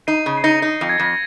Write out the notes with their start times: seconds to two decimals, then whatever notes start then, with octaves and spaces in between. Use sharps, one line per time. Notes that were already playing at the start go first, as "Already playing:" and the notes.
0.07 D#4 C7 D#7
0.26 C#3
0.37 C7
0.44 D#4 A#6 C#7
0.62 D#4
0.81 F2
0.89 G#6
0.99 F2 A#6